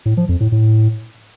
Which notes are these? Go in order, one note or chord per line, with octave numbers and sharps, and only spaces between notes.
A2
F3
F2
A2
A2